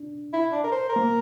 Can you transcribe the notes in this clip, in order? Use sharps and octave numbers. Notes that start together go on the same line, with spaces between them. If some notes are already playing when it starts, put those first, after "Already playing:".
Already playing: D4
E4
D4
A#4
C5
A#4
A#3